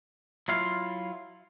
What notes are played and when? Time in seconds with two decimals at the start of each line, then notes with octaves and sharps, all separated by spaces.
0.48 F#3 E4 F4 F5